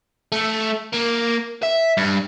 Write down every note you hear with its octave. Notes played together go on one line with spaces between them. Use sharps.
A3
A#3
E5
G2